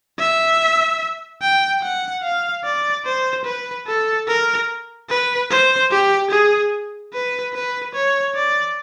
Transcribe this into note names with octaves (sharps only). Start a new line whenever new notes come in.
E5
G5
F#5
F5
D5
C5
B4
A4
A#4
B4
C5
G4
G#4
B4
B4
C#5
D5